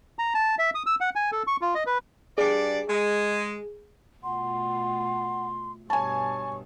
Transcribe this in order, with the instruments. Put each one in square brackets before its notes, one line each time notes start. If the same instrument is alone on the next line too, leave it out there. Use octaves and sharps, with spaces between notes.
[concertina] A#5
A5
E5
D#6
E6
F#5
G#5
A4
C#6
F4
D#5
B4
[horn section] G2 D5 [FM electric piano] G#4
[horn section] G#3
[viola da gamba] B2 A3 F4 [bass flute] F#5 [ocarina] C6
[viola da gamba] G2 B2 [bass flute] C#5 [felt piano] G#5 A5 [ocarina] C#6